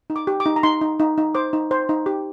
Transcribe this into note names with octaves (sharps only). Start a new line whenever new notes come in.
D#4
D6
G4
D6
D#4
A#5
D#4 C6
D#4
D#4
D#4
C5 D6
D#4
C5
D#4
G4